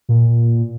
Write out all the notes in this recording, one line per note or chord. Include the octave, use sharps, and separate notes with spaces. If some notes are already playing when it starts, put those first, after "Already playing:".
A#2